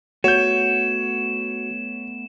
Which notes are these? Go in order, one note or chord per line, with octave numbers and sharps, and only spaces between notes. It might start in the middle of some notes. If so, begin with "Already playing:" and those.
A3 B3 F#4 C#5 G6 E7